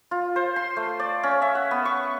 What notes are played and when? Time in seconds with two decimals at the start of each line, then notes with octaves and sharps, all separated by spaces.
0.11 F4
0.36 C5
0.56 C6
0.77 A3
0.99 D5
1.23 C#4
1.42 E5
1.55 F#5
1.71 B3
1.85 C#6